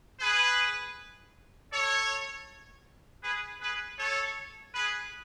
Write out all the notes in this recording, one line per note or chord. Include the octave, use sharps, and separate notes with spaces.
G#4 B4
A4 C#5
G#4 B4
G#4 B4
A4 C#5
G#4 B4